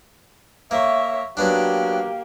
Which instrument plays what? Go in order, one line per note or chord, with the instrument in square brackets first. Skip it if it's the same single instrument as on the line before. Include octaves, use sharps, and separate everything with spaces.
[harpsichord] A#3 [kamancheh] C#5 E5
[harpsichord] F#3 B3 D4 [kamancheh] A#3 G4